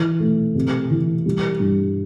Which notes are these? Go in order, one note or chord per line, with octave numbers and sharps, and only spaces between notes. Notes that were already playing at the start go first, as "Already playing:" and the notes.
Already playing: E3
A3
C3
E3
G3
G2